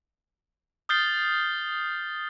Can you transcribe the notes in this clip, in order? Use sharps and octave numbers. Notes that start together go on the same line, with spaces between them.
D#6 F6 G6 A6 C7 G7